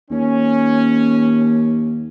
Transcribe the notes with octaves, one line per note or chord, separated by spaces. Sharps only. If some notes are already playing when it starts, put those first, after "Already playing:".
D#2 C#4